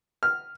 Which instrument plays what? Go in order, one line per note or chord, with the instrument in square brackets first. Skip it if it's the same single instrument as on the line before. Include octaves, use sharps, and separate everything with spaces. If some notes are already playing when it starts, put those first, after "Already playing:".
[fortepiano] F6